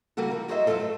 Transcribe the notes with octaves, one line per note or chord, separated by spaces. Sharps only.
C#3 G3 A#3 F#4 A4
F3 A#4
D#4 F#4 G#4 C5 D#5 E5
G2 F#3 D4 F4 A4 C5
A3